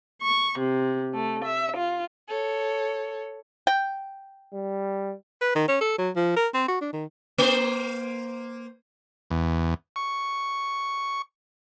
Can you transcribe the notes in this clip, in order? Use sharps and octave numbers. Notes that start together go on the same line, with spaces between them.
C#6
C3
A3
E5
F4
A4 C#5
G5
G3
B4
D#3
C#4
A4
F#3
F3
A#4
C4
F#4
D4
D#3
A#3 C5
E2
C#6